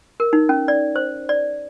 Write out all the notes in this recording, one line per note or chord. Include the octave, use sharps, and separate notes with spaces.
A#4
D#4
C#4
D5
C5
D5